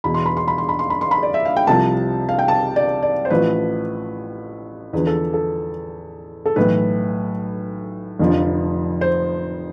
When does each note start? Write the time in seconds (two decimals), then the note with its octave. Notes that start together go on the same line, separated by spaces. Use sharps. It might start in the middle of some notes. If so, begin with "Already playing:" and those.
0.04 E2 B2 B5
0.14 C6
0.26 B5
0.37 C6
0.48 B5
0.58 C6
0.69 B5
0.79 C6
0.90 B5
1.01 C6
1.11 B5
1.23 D5
1.34 E5
1.45 F5
1.56 G5
1.67 C2 C3 F3 A5
2.29 F5
2.39 G5
2.48 A5
2.76 D5
3.03 D5
3.25 C5
3.30 A1 A2 F3 B4
4.93 E2 D3 F3 B4
5.07 A4
5.34 A4
6.46 A4
6.56 B1 A2 E3 B4
8.19 F1 F2 D3 F3
9.01 C5